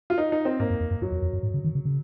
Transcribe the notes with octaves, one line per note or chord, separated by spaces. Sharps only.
F4
D#4
D#4
C4
G#2 A#3
F#2
F2
F#2
F#2 F#3
F2
F2
F#2
G#2
C#3
D#3
C#3
C#3